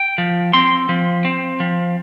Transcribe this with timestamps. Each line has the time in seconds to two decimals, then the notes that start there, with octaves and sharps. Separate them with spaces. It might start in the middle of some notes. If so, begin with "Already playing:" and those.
Already playing: G5
0.18 F3
0.53 C4 C6
0.89 F3
1.25 C4
1.60 F3